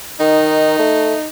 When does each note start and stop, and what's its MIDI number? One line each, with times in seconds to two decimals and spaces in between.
0.20 0.77 51
0.20 1.28 63
0.79 1.14 57